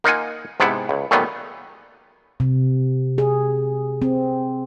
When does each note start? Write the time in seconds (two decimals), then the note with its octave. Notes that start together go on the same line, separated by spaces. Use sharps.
0.04 A#3 D#4 F4 F#5 G#5
0.60 G#2 C3 B3 E4 F#5
0.89 C#2
1.11 A#2 D#3 F#3 G3 A3 B3
2.40 C3
3.18 G#4
4.02 C4